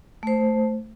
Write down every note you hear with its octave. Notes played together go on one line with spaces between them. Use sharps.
A3 C5